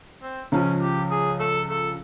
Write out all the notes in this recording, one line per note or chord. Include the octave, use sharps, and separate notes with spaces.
C4
C#2 C#3 F3 C#4
G4
G#4
A4
A4